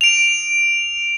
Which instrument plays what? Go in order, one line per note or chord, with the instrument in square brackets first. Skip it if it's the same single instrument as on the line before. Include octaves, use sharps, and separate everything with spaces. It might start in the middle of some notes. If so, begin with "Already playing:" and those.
[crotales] D7 F7